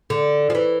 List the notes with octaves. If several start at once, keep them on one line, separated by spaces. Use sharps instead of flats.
D3
F3
E3